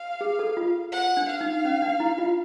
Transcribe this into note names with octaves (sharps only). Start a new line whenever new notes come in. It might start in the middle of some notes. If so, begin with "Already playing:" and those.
Already playing: F5
G#4
A4
F4
F#5
D4
F5
D#4
C#4
D4
E4
F4